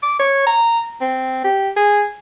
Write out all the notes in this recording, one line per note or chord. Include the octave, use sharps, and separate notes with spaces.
D6
C#5
A#5
C4
G4
G#4